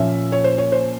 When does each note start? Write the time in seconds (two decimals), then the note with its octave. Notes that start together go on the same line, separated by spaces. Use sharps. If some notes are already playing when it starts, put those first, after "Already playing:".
Already playing: A#2 F3 A#3 C#4 E5
0.32 C#5
0.44 C5
0.58 C#5
0.72 C5